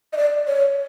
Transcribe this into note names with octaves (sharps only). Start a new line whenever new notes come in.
D#5
D5
C#5